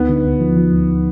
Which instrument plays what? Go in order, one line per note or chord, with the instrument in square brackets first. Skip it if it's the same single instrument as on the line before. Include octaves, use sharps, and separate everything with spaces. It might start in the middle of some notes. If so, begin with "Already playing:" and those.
Already playing: [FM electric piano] D2 D#4 [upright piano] B3
[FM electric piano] D3
D2
F3
F3
D2